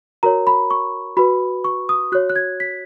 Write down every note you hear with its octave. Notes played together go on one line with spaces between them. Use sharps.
F#4 A#4 C#5 A#5
B5
C#6
F#4 B4 B5
C#6
D#6
F#4 C#5 F#6
F#6
G#6
B6